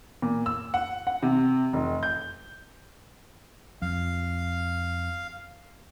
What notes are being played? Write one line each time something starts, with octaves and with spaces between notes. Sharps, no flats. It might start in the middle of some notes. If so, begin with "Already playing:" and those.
A#2
E6
F#5
F#5
C3
F1
G6
F2 F5